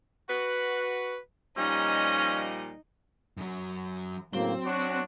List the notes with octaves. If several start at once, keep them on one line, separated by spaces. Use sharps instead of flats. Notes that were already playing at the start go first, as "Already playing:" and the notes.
F#4 B4
A#2 F3 G3 C#4 D#4 D#5
F#2 F#3
A2 C#3 F#3 A#3 C4 G7
D4 F#4 C#5